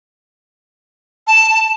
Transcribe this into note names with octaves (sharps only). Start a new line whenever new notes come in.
A5